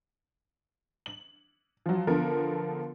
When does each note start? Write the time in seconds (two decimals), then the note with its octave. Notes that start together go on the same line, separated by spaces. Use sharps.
1.06 F#7
1.86 F3 F#3
2.07 D3 F3 B3 A4 A#4